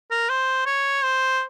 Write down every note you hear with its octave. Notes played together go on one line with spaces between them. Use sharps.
A#4
C5
C#5
C5